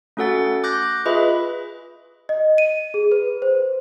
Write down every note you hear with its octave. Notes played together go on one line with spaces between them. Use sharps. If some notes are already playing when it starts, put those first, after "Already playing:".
A3 C#4 F#4 A4 F#5 A6
D6 F#6 G6 A#6
F4 G#4 B4 D#5 E5 B5
D#5
D#7
G#4
B4
C5